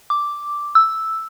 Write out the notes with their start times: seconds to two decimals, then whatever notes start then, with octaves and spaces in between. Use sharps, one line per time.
0.10 D6
0.75 E6